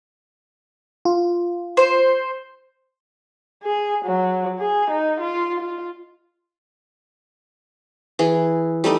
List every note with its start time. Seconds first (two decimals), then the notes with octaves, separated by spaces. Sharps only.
1.05 F4
1.77 C5
3.64 G#4
4.05 F#3
4.59 G#4
4.90 D#4
5.20 F4
5.60 F4
8.19 E3 G#4
8.84 G3 A3 D#4 D#5